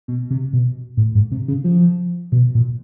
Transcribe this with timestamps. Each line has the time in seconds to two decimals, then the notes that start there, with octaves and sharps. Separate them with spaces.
0.08 B2
0.30 C3
0.53 B2
0.97 A2
1.15 G#2
1.31 C3
1.48 C#3
1.64 F3
2.32 B2
2.55 A#2